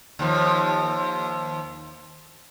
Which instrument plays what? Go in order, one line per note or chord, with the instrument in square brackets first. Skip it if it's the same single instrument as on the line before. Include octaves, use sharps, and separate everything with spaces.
[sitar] D#2 F3